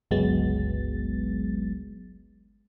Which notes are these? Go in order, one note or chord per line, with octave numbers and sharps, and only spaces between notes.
G1 C#2 F#3 G#3 B3 A6